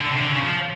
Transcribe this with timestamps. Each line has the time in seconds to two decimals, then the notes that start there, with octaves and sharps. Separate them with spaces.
0.01 D3
0.10 C3
0.20 D3
0.30 C#3
0.40 F3